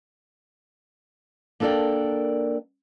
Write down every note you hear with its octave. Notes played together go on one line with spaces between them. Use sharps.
A#3 D4 A4 A#4 D5 G5